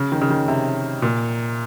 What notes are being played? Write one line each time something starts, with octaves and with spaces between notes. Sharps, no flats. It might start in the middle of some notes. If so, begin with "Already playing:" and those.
Already playing: C#3
D#3
C#3
D#3
C3
A#2